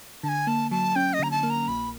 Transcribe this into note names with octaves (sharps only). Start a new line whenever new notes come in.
D3 G#5 A5
A#3 A5
F#3 A5
C#4 G5
D#5
D3 A#5
A5
A#3
A#5
A#1 B5